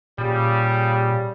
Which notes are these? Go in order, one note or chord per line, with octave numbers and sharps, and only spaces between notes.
A#2 C#3 G3